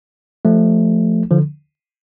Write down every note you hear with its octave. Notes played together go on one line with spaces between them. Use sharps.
F3 A3
D3 F3